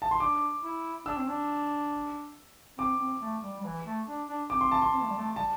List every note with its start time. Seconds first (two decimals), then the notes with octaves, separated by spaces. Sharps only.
0.02 A5
0.11 C6
0.20 D4 D6
0.63 E4
1.06 D4 E6
1.17 C4
1.28 D4
2.78 C4 D6
2.99 C4
3.21 A3
3.43 G3
3.61 G3
3.64 E3
3.86 A3
4.08 D4
4.28 D4
4.50 C4 D6
4.61 C6
4.72 A5
4.82 C6
4.93 C4
5.02 A3
5.10 G3
5.17 A3
5.36 G3 A5